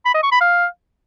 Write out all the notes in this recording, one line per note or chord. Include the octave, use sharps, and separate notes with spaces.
B5
D#5
C#6
B5
F5